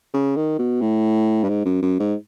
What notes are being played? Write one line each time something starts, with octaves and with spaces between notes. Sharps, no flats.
C#3
D#3
B2
A2
G2
G#2
F#2
F#2
G#2